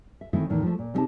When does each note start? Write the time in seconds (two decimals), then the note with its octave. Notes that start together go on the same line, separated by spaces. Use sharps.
0.21 E5
0.33 D#3 E3 A3 C4 D#4 E4
0.50 E2 A2 D#3 E3
0.63 F3 A3
0.79 A#2
0.94 C3 G3 C4 D#4 G4 A5